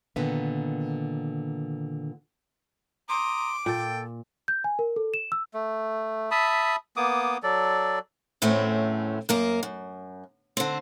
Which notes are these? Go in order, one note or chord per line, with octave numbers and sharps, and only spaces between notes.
A#2 D3 D#3 B3 E5
A#5 C6 D6 D#6
A#2 A4 G5
G6
G#5
A#4
A4
E7
E6
A3
E5 A5 B5 D#6
A#3 B3 D6 D#6
F#3 A4 D5
E2 A2 A3 C4 C#4
F#2 A#3 A#4
F#2
D3 C4